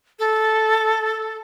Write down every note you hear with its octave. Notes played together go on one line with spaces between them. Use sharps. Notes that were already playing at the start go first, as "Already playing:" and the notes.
A4